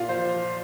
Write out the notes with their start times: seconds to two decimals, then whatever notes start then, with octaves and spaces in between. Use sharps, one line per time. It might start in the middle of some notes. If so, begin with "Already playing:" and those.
Already playing: A#2 F4 F5
0.08 F3 C5